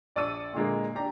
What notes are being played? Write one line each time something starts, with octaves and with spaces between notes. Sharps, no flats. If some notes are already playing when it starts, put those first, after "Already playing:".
A#1 D5 A5 C#6 E6 D#7
A#2 D3 G#3 A#3
D4 G4 A#5